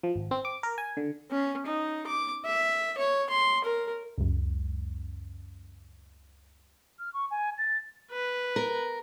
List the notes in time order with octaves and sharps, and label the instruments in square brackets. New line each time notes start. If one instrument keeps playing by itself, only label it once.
[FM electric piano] F3
G#1
C4
D6
A#4
G#5
D3
[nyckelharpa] C#4
D#4
D6
E5
C#5
C6
A#4
[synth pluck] C#2 F#2
[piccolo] F6
C#6
G#5
A6
[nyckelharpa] B4
[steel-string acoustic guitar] A#4